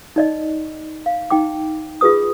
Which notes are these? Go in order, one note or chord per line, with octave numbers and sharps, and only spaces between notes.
D#4 D5 D#5
F5
D#4 G5 D6
F4 G#4 B4 D#6